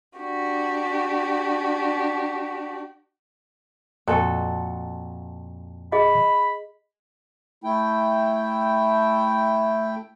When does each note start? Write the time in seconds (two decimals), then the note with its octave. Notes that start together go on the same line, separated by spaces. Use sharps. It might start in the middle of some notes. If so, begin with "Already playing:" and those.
0.19 D4 F#4 G4
4.08 F2 A#2 F#4 A4
5.92 G#4 D#5 B5
7.64 A3 E4 G5